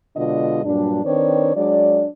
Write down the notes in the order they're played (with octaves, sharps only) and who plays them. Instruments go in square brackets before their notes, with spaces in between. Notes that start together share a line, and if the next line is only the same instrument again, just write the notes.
[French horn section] B2 D3 G#3 D4 F4 D#5
G2 A#2 F#3 G3 D4
D#3 C4 D4 B4 C#5 D5
F#3 G#3 D4 D5